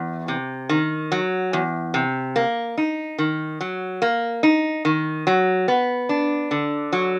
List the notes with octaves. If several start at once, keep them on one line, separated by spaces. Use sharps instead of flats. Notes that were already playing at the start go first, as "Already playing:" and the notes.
Already playing: E2
C3
D#3
F#3
E2
C3
A#3
D#4
D#3
F#3
A#3
D#4
D#3
F#3
B3
D4
D3
F#3